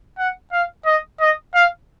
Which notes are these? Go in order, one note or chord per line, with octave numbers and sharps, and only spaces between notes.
F#5
F5
D#5
D#5
F5